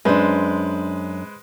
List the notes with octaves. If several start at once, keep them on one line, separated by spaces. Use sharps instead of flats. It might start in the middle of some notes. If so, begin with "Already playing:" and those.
F#2 G#3 D4 B4 C5